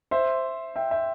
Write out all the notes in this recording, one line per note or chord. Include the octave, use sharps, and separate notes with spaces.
C5 E5
E5 G5
E5 G5